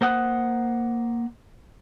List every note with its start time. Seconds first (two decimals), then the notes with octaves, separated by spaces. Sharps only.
0.01 A#3 C5 F#5 D#6 F#6